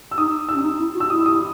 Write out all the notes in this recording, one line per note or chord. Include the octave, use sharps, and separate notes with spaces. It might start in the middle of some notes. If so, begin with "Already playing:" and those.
E6
D#4 D#6
D#4 E6
C#4
D#4
E4
F#4
E6
E4 D#6
D#6